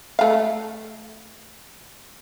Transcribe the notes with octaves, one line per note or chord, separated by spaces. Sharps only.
A3 F5